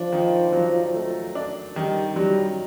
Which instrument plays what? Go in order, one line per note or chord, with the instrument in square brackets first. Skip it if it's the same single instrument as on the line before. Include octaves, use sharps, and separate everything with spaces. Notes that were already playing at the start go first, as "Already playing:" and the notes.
Already playing: [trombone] F3 [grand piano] D4
[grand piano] D#3
F#3
A3
D4
[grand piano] D#3 [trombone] G3
[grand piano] F#3 [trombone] G3